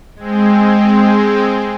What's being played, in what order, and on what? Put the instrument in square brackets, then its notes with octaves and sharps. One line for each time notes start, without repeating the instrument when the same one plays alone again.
[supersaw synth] G#3 C4